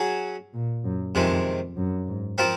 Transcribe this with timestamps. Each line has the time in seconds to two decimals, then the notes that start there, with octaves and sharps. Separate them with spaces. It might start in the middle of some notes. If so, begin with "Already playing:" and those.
Already playing: F#3 C#4 G#4
0.54 A#2
0.84 F#2
1.15 F2 C3 D#3 G#3
1.77 F#2
2.07 G#2
2.38 F3 C4 F4 A#4